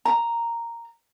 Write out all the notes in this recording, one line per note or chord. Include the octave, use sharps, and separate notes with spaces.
A#5